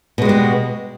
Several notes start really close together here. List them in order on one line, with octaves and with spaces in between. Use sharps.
B2 G#3 G3 B3